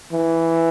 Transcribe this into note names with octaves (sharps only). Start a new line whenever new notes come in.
E3